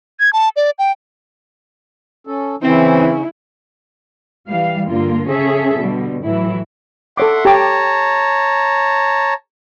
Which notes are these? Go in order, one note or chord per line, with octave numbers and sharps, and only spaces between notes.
G#6
A5
D5
G5
C#4 A4
C#3 E3 C4 C#4 E4
E3 G3 F5
G2 D3 A#3 F4
C#3 C#4 G#4 A4 E5
B2 D3 G3
A2 E3 F#3 E4
A4 C#5 E5 F#5 C6 D6
G4 C#5 A5 A#5 D6